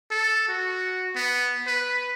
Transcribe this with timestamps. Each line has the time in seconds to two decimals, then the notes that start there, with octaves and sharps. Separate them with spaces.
0.11 A4
0.48 F#4
1.16 B3
1.67 B4